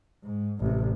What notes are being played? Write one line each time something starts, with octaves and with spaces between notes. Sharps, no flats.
G#2
A1 C3